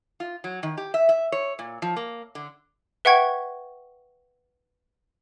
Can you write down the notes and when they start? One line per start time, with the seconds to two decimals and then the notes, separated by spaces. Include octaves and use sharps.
0.20 F4
0.44 F#3
0.63 D#3
0.77 G4
0.94 E5
1.09 E5
1.32 C#5
1.59 A#2
1.82 F3
1.97 A#3
2.35 D3
3.05 B4 E5 F#5 G5 C#6 G#6